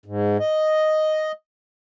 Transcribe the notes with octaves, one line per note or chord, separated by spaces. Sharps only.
G#2
D#5